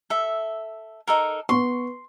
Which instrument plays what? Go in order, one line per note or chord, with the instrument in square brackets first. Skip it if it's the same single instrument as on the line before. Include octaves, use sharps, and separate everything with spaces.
[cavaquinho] A4 E5
D#4 A4 A#4
[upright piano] B3 C#6 [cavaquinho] C6